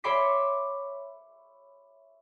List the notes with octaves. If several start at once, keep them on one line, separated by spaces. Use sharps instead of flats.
C#5 E5 B5 C6 D6 B6